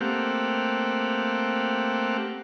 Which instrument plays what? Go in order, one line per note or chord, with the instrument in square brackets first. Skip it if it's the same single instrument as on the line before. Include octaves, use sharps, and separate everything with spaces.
[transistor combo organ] A3 A#3 C4 G4 F5 F#5